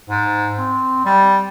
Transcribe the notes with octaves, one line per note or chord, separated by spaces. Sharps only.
G#2
C4
G3